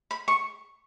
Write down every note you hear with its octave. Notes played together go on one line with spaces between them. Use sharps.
B5
C#6